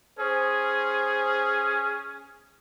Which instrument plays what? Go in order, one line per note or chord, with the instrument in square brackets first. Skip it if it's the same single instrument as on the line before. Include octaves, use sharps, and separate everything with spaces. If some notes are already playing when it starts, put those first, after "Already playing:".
[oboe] C#4 [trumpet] G#4 [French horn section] C5